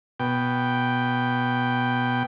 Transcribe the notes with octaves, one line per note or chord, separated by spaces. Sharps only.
B2 G5